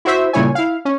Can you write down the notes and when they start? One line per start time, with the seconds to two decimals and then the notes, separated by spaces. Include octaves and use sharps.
0.05 E4 F#4 C5 E5
0.33 A#2 C#3 G3 E4 C#5 G#5
0.55 E4 F5
0.85 C#4